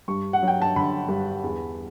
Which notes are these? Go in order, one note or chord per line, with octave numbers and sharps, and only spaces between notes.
G2 C#6
F#5
F#3 G5
A5
D3 B5
G2
E2